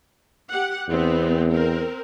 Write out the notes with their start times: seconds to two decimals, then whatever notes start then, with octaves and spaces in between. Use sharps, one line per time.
0.50 G4 F#5
0.89 E2 B3 C4
1.52 C4 A#4